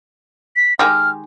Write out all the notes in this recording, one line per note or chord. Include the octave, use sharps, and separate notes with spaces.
B6
D#3 G#3 G4 F6